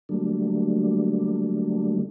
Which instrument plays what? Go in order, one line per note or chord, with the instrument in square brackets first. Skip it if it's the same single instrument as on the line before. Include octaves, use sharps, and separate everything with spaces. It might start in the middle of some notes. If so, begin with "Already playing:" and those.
[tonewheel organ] D3 F#3 G3 A3 A#3 D4